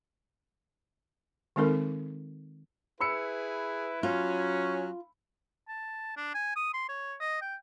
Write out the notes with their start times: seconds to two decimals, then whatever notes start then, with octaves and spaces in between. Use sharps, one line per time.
1.56 D#3 G#3 C4 D#4 A4 A#4
3.00 E4 G#4 B4 B5 E6 C#7
4.03 F#3 C#4 F4
5.68 A5
6.17 D4
6.34 G#5
6.56 D#6
6.74 C6
6.89 C#5
7.20 D#5
7.41 G5